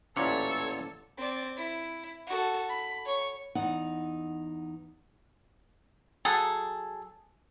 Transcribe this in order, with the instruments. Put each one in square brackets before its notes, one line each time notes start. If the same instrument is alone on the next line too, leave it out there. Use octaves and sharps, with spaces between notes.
[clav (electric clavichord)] A1 D2 A#2 [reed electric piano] C#4 E4 [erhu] A4 [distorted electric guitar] C#5
[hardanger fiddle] C4 D5
E4
F#4 A4
B5
C#5 C#6
[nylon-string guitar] E2 D#4 F#5
[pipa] F#3 G#4 A4